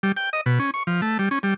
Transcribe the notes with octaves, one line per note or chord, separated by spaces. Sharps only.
G3
G5
D#5
B2
C#4
C#6
F3
A3
G3
C#4
G3